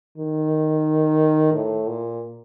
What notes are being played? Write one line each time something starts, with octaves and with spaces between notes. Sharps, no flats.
D#3
A2
A#2